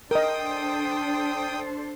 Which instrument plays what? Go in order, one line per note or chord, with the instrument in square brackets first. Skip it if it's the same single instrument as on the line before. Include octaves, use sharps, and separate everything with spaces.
[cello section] D4 A4 C5 [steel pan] A#4 D#5 [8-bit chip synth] G5 D#6